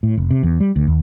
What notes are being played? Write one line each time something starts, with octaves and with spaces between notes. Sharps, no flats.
A2
F1
C3
E2
G3
D2
D#2